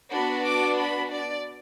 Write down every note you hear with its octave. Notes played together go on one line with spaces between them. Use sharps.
B3 D4 F#4 B5
D6
B5
D5